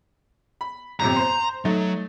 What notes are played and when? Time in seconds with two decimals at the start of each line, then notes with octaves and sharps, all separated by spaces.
0.61 B5
1.00 G1 F2 C3 A#5
1.16 C5 C6
1.65 F#3 A3 D#4